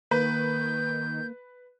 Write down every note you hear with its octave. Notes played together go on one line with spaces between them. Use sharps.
D#3 A#3 B4 G6